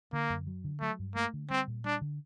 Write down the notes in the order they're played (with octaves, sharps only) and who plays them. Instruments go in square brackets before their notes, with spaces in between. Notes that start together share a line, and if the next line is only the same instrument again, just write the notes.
[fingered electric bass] D3 [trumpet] A#3
[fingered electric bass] F#2
F#3
D3
[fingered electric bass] F#3 [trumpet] A3
[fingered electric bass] G2
[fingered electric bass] A3 [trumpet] A#3
[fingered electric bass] D3
[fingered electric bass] G3 [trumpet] C4
[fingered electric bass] A#2
[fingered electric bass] G3 [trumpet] D4
[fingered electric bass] D3